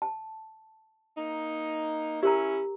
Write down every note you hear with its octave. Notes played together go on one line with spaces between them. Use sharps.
A5
A#3 D#4
C#4 E4 G4 A#4 A#5